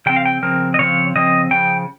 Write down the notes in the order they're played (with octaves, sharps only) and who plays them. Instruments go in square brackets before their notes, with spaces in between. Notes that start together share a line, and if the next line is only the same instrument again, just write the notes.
[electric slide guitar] C#3 F3 C4 G5
F5
G5
C#3 F3 C4 A#4
D#5
C#3 F3 C4 C#5
C#3 F3 C4 D#5
C#3 F3 G5